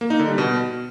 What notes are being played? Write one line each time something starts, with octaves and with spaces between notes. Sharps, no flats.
A#3
D#4
D3
G3
B2